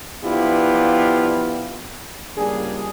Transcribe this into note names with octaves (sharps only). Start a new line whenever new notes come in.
F3 B3 D4 E4 F4 G4
C#2 G3 A#3 D4 G#4